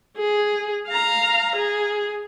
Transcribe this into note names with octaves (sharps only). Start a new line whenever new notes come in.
G#4
F5 A#5
G#4